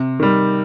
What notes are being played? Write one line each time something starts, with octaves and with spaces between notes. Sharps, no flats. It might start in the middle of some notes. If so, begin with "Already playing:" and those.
Already playing: C3
D#3 G3